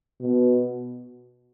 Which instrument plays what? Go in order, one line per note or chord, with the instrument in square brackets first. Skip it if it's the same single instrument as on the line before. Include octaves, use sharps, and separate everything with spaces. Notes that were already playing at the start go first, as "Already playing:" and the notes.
[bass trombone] B2